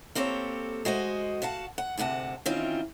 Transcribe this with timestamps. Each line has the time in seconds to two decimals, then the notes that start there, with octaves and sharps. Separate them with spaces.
0.15 A#3 C4 G4 A4 C#5
0.85 G#3 F#4 C5 D#5
1.42 F#4 F5 F#5 A5
1.78 F#5
1.97 D2 G#2 C3 F#5 A5
2.46 D#3 E3 C4 C#4 F4